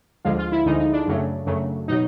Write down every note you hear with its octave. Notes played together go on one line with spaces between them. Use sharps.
D2 D3 F3 G#3 F4
F4
E4
D2 D3 F3 G#3 D#4
D#4
D4
F#2 C#3 F#3 A3
F#2 C#3 F#3 A3
B2 F#3 D#4